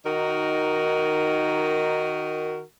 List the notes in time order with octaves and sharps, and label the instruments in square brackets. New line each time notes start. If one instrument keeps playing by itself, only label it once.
[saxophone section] D#3 D#4 F#4 A#4